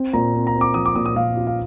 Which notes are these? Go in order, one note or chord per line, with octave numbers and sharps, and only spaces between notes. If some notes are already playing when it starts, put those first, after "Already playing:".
Already playing: C4
A#2 A#5
C4
A#5
C4
D6
F3 D#6
D6
A#2 D#6
D#6
A#2 F5
F4
F5